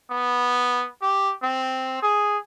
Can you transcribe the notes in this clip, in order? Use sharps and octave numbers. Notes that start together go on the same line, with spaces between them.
B3
G4
C4
G#4